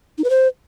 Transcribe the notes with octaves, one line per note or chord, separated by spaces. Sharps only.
D#4
B4
C5